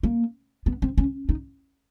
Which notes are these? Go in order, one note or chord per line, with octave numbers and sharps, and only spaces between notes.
A#3
B3
C4
C#4
D#4